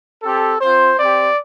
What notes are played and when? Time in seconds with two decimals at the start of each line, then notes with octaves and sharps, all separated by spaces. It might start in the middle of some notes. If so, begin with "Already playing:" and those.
0.23 C4 G4 A4
0.61 C4 F4 C5
0.98 C4 G4 D5